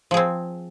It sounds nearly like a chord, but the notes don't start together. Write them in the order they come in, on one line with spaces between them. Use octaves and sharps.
F3 G#4 C4